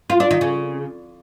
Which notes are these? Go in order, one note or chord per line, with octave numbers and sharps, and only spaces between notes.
F4
D4
D#3
C#3